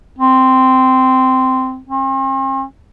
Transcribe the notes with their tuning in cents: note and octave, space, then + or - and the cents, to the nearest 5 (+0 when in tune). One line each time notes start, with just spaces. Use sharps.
C4 -10
C4 +45